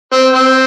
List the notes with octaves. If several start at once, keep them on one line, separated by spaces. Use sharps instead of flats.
C4
C4